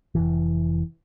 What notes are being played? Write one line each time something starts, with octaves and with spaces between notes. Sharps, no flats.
F1 C#2 E3